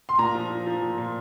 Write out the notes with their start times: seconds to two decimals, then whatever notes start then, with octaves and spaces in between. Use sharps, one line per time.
0.09 C6
0.18 A#2 A#5
0.35 F3
0.50 F3
0.66 F3
0.82 A#2
0.98 A#2